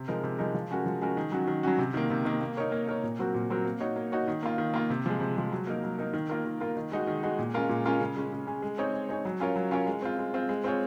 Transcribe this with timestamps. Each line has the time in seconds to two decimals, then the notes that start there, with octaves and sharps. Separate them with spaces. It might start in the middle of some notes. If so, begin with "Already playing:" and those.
Already playing: C3
0.08 F3 G#3 D#4 A#4
0.23 C3
0.39 F3 G#3 D#4 A#4
0.54 F3
0.71 G#3 C#4 F#4 A#4
0.86 F3
1.01 G#3 C#4 F#4 A#4
1.17 D#3
1.32 F#3 C#4 F#4
1.47 D#3
1.63 F#3 C#4 F#4
1.78 C3
1.94 D#3 A#3
2.10 C3
2.25 D#3 A#3
2.41 A#3
2.57 D#4 A#4 C#5
2.72 A#3
2.87 D#4 A#4 C#5
3.03 A#2
3.19 F#3 C4 F#4 A#4
3.34 A#2
3.50 F#3 C4 F#4 A#4
3.65 A#3
3.80 D#4 F#4 C#5
3.96 A#3
4.12 D#4 F#4 C#5
4.28 D#3
4.43 A#3 F4
4.58 D#3
4.74 A#3 F4
4.90 C3
5.06 F3 G#3
5.20 C3
5.36 F3 G#3
5.52 F#3
5.67 A#3 D#4 A#4
5.84 F#3
5.98 A#3 D#4 A#4
6.13 D#3
6.29 A#3 F4 A#4
6.45 D#3
6.60 A#3 F4 A#4
6.77 D#3
6.92 G#3 D#4 F#4
7.07 D#3
7.23 G#3 D#4 F#4
7.39 A#2
7.54 G#3 C#4 F4 A#4
7.69 A#2
7.85 G#3 C#4 F4 A#4
8.00 C#3
8.16 G#3 C#4
8.32 C#3
8.47 G#3 C#4
8.62 G#3
8.78 C4 D#4 G#4 C#5
8.94 G#3
9.09 C4 D#4 G#4 C#5
9.25 F#3
9.40 C#4 F4 A#4 C#5
9.56 F#3
9.71 C#4 F4 A#4 C#5
9.87 G#3
10.02 C4 F4
10.19 G#3
10.34 C4 F4
10.49 G#3
10.64 C4 F4 G#4 C#5